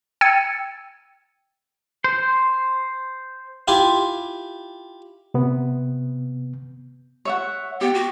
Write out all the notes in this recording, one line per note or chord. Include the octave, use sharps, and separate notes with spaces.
G5 E6 G#6 A6 C#7 D#7
C5
E4 F4 G4 G#5 C6
C3 B3
C#5 E5 F#5
B3 G4
F#4